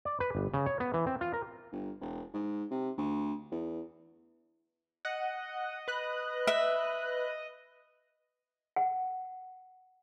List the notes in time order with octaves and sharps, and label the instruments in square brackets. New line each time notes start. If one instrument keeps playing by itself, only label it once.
[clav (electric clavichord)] D5
B4
G1
C#3
C#5
B3
E3
C4
F4
A#4
[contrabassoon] G1
E1
G#2
C3
D2
E2
[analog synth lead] D#5 [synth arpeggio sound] F#5
[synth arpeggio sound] B4 F#6
[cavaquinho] E5
[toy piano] F#5